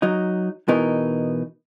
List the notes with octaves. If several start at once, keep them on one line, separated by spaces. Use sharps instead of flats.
F#3 D#4
B2 E3 D#4 A#4